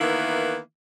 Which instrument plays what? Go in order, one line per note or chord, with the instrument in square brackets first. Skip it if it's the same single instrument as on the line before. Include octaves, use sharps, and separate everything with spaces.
[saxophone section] D#3 E3 A#3 B3 E4